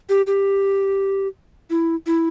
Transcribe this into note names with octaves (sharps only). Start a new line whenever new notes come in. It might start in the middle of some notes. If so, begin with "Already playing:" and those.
G4
G4
E4
E4